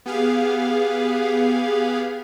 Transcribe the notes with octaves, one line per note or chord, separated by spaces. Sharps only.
B3 G4 G#4 F5